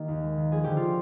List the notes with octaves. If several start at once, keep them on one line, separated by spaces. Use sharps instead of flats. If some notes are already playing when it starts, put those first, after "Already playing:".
Already playing: D#3 A#3 G4
D#2
G#3
D#3
F3 G#4
D3 G4
F4